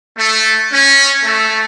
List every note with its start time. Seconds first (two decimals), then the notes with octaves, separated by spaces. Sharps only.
0.17 A3
0.71 C#4
1.23 A3